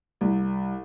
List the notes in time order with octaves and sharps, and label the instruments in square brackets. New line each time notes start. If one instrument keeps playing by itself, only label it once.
[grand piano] C2